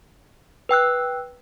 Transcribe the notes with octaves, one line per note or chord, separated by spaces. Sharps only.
B4 G5 E6 F#6